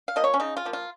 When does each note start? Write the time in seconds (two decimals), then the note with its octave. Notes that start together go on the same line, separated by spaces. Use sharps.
0.08 F5
0.16 F3 A#3 D#5
0.24 C#5
0.34 C#4
0.40 C#3 D#4
0.57 F4
0.65 F3 A#3
0.73 F4